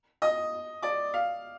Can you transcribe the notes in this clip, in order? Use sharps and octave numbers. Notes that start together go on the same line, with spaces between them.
D#5 D#6
D5 D6
F5